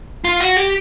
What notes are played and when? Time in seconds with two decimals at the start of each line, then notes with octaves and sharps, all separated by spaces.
0.24 F4
0.40 F#4
0.56 G4